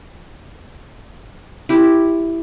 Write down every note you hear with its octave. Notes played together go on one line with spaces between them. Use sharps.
E4 G4